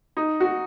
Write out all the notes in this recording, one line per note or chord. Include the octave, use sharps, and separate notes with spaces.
D#4
F#4